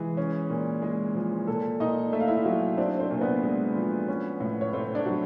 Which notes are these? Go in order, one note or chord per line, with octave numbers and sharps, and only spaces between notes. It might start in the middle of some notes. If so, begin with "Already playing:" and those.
Already playing: E3 G#3 G#4
C#4
A#2
G#3
F3
A#2 A4
A#2 D#4 D#5
A3 E5
F5
E4 E5
F#3
C4 D4 D5
C4 C5
A#2
B3 B4
G#3
F3
C#4
A2
C#5
A3 C4 C5
D4 D5
F#3